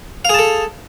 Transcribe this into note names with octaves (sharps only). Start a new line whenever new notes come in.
G#4 A4 F5 A5